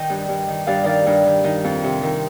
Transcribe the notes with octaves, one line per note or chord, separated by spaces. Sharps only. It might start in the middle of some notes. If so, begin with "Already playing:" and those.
Already playing: D#3 D#5 G5
G2
G2
D#3
G2 D5 F5
D#3 D5 F5
G2
D#3
D#3 D#4
F2
C3
D#3